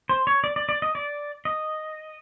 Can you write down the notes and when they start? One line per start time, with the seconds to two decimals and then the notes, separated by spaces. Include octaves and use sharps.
0.09 C5
0.27 C#5
0.44 D5
0.56 D5
0.69 D5
0.82 D#5
0.95 D5
1.45 D#5